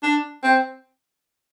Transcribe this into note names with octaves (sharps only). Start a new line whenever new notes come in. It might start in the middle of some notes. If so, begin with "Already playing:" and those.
D4
C4